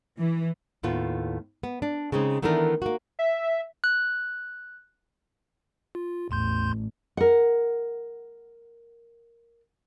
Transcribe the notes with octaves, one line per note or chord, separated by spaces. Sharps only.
E3
D#2 A2 B3 F4
B3
D4
C#3 G#3 C4 C#4 D#4
D#3 E3 A3 B3 D4 A#4
A#3 F#4
E5
F#6
F4
A1 E2 C6 G6
A#4 F#5